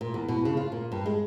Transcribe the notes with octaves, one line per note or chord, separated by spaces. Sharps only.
A#2
E2
B2
C#3
F4
A#2
G2
G#3